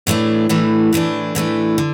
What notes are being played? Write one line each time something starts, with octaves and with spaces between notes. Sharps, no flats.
A2 E3 A3 D4
A2 E3 A3 D4
A2 E3 A3 D4
A2 E3 A3 D4
D3